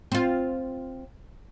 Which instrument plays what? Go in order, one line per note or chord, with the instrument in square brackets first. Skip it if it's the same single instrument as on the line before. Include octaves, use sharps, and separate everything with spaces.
[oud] C4 F4